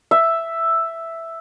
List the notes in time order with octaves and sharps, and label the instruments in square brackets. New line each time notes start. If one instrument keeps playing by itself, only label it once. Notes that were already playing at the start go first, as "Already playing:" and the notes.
[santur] E5